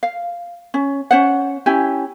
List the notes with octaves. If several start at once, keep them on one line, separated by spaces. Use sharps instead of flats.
F5
C#4
C#4 C5 F#5
C#4 E4 G4 G#5